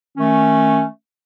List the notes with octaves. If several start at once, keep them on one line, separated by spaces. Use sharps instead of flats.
D#3 A3 C#4